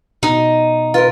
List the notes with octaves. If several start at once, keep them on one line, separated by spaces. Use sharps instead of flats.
B2 D#4
F4 A#4 B4